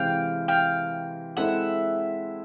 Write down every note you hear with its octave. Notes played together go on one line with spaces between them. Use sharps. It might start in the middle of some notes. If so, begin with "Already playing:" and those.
Already playing: C3 E3 G#3 C4 F5 G5
F5 G5
G#3 C4 E4 A4 E5 F#5